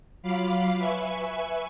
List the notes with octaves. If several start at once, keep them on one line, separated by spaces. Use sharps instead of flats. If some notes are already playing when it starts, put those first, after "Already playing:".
F#3 F4 F5 B5 D6 C7
B4 E5 G#5 C#6